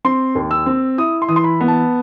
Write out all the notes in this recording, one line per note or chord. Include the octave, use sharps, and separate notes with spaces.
C4 C6
D#2
E6
C4
E4 D#6
C6
E3 D#6
C6
B5
B3
A5